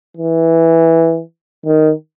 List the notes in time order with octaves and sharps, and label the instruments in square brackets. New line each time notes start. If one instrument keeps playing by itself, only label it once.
[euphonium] E3
D#3